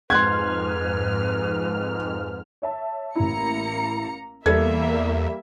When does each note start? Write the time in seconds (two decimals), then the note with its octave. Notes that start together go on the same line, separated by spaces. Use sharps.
0.10 F2 G#2 B4 C6 F6 F#6 G#6
2.62 C#5 E5 A5
3.16 A1 A#3 E4 A#5 C#7
4.46 E2 G3 A#3 A4 E5 G#6